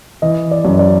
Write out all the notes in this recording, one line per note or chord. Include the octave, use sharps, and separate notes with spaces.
E3 D#5
D5
F#2
D5